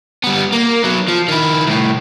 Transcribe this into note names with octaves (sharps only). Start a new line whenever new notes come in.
G3 B3
A#3
F#3 B3
F3
D#3 E4
C2 A2